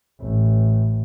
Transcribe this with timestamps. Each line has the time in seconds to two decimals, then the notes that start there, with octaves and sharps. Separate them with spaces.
0.20 A1